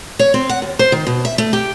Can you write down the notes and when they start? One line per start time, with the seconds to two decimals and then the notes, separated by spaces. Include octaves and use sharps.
0.19 C#5
0.34 C4
0.49 F#5
0.62 D#2
0.79 C5
0.92 D#3
1.07 B2
1.25 E5
1.38 A3
1.53 G4